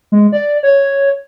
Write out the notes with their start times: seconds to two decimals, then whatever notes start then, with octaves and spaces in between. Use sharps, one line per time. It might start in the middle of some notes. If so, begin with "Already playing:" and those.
0.12 G#3
0.32 D5
0.63 C#5